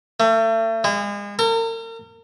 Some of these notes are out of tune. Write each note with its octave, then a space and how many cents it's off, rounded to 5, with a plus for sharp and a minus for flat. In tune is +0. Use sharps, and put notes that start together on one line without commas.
A3 +35
G#3 -35
A#4 -40